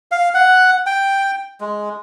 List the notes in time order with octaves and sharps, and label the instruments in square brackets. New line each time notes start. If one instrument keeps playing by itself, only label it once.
[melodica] F5
F#5
G5
G#3